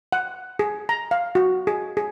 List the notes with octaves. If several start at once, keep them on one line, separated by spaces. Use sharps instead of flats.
F#5
G#4
A#5
F5
F#4
G#4
G#4